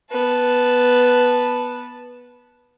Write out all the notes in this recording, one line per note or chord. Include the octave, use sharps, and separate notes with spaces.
B3 A5